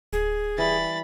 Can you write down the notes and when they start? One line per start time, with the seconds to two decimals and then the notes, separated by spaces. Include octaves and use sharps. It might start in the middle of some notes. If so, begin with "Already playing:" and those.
0.13 D1 G#4
0.58 E3 G3 B5 A6